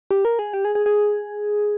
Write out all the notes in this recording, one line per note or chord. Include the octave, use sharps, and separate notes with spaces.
G4
A#4
G#4
G4
G#4
G#4
G#4